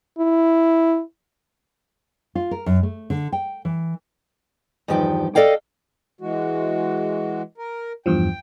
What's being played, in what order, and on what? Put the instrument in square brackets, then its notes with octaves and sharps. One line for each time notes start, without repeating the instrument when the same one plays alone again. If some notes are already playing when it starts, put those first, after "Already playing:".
[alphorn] E4
[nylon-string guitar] F4
A#4
F#2
A3
D3
G5
E3
[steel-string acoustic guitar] E2 G2 D#3 F3 G4 G5
A4 D5 D#5 F5 G5
[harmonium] E3 G#3 F#4
A#4
[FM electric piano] E2 G2 F3 [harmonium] G5